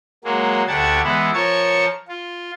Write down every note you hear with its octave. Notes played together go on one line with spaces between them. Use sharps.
F#3 G#3 A#3
D2 D4 G4 F#5 A5 G#6
E3 G#3 B3 E4
F3 A#4 C#5 A5 C#6 G#6
F4